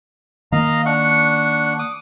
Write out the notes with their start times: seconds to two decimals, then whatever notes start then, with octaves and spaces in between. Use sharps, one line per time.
0.52 D#3 A#3 D#5 F5 A#5
0.86 D4 F#5 C#6
1.79 D6 D#6